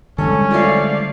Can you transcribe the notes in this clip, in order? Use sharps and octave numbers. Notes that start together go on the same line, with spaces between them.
D3 G3 G#3 C#4 A4
F3 A3 D5 F5